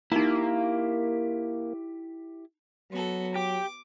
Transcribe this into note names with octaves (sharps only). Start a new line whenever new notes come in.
A#3 D#4 E4 G4 A#5
F#3 B3 F#4 A4
G4 D6